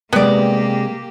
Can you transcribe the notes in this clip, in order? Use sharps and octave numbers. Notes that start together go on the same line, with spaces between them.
C3 G#3 A#3 B3 G4 D5